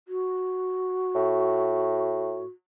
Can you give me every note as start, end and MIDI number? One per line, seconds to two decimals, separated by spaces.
0.08 2.46 66
1.15 2.44 45